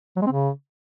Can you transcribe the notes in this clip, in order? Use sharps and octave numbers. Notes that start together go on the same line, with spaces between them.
F#3
G#3
C4
C#3